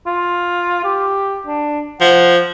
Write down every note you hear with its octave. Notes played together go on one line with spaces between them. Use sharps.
F4
G4
D4
F3 F#5